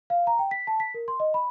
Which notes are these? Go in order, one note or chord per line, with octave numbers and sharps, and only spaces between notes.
F5
A#5
G5
B6
A5
B6
A#4
C6
D#5
B5